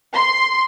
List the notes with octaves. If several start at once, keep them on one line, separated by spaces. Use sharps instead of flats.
C6